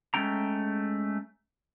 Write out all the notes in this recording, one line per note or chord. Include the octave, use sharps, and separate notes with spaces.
G#3 A3 C#4 G5 A#5